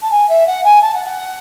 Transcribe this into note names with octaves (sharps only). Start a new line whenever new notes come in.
A5
G#5
E5
F#5
G#5
A5
F#5
F#5